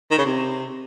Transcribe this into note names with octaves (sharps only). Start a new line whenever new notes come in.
D#3
C#3
C3